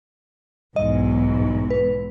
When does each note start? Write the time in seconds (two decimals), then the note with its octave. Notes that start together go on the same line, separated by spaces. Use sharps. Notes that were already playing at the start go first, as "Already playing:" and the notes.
0.76 B1 E2 G#2 D#5
1.70 B4